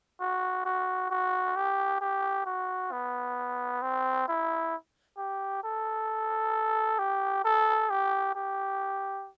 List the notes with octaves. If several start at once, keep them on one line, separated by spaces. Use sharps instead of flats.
F#4
F#4
F#4
G4
G4
F#4
B3
C4
E4
G4
A4
G4
A4
G4
G4